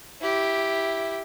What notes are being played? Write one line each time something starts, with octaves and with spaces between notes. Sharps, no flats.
E4 G4